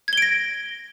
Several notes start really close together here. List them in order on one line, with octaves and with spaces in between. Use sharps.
G#6 G7 D7 A#6